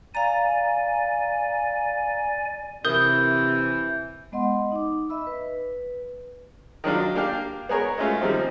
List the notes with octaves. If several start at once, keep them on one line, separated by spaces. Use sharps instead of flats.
D5 F5 G#5 A#5
C3 E3 A#4 D#6 G6 G7
G#3 B3 D#5 F#5 C6
D#4 D6
D#5 E5 B5 E6
B4
D#3 F#3 D4 F4
A#3 D4 G4 F5
B3 G#4 A#4 C#5
G#3 A3 C#4 F4
D#3 F3 G3 A#3 C4